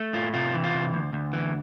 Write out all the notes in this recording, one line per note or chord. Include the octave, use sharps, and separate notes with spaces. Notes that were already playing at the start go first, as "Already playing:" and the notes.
Already playing: A3
A2 F4
C3 F4
E3
F4
C3
D2
D2
E3